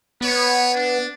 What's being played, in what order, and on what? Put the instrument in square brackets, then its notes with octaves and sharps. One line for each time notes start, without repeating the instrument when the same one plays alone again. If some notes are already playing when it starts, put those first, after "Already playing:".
[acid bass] B3 [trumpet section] B4 C#5
[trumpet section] D4